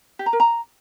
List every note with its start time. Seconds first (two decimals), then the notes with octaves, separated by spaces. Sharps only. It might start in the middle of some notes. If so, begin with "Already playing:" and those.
0.19 G4
0.26 A#5
0.33 A#4
0.40 A#5